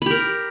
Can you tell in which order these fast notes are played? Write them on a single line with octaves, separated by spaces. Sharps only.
B5 G4 A#4